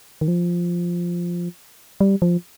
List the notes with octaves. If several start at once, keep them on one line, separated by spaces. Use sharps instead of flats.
D#3
F3
G3
F3